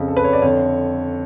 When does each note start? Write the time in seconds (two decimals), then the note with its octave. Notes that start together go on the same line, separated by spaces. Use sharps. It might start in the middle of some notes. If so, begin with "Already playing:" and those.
Already playing: F2 C#3
0.08 A4
0.17 B4
0.24 C#5
0.33 D5
0.42 F2 D3 C#5